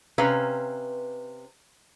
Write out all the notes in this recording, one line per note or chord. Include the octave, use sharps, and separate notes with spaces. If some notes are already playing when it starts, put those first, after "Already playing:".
C3 C#4 B4 C5 F5 A#5